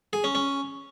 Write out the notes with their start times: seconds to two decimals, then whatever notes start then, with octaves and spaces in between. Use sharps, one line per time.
0.13 G#4
0.24 C#4
0.35 C#4